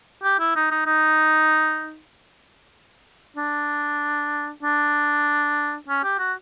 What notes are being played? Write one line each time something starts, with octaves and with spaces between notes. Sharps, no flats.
G4
E4
D#4
D#4
D#4
D4
D4
C#4
G4
F#4